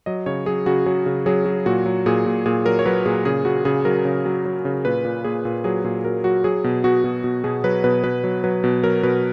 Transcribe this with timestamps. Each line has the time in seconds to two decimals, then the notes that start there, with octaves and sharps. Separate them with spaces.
0.06 F#3 D#5
0.26 C#3 C#5
0.46 F#3 G#4
0.66 C#3 F#4
0.86 F#3 G#4
1.06 C#3
1.26 F#3 G#4
1.46 F#3
1.66 A#2 F#4
1.86 F#3
2.06 A#2 G#4
2.26 A#2
2.46 A#2 G#4
2.65 F#3 A#4
2.79 C#5
2.86 F#3 B4
3.06 A#2 G#4
3.25 C#3 G#4
3.45 C#3 F#4
3.65 C#3 G#4
3.85 F#3 A#4
4.05 C#3
4.26 F#3
4.45 F#3
4.65 C#3
4.85 A#2 B4
5.05 A#2
5.24 A#2 G#4
5.45 A#2
5.64 F#3 G#4
5.84 A#2 G#4
6.04 F#3 A#4
6.24 F#3 F#4
6.44 F#3 G#4
6.64 B2
6.84 B2 F#4
7.04 B2
7.24 B2
7.44 B2 G#4
7.64 F#3 B4
7.84 B2 B4
8.04 B2 B4
8.24 F#3
8.44 F#3 B4
8.64 B2
8.83 F#3 A#4
9.03 B2 B4